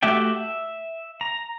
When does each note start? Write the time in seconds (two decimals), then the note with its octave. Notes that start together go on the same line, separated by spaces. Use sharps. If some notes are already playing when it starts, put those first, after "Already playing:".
0.03 A3 F#4 G4 E5 G5
0.34 E5
1.21 A#5